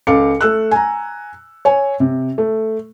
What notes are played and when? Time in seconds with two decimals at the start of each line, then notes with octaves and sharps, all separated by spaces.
0.07 C#2 A4 F5 D6 C#7
0.41 A3 E6 F#6
0.71 G#5 A#5
1.65 C#5 G#5
2.00 C3
2.38 A3